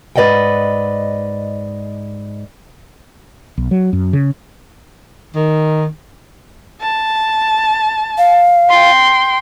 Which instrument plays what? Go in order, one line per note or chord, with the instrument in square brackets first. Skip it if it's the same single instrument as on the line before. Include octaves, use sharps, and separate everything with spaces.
[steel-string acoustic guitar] G#2 B4 D5 D#5 F#5 G5
[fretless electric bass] B1
F#3
F#2
C#3
[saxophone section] D#3
[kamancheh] A5
[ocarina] F5
[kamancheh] G5 C6